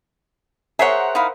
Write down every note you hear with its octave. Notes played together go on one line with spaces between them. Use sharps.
G#4 A#4 C5 C#5 E5 F#5
D#4 E4 F5